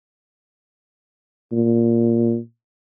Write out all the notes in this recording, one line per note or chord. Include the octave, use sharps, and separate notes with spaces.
A#2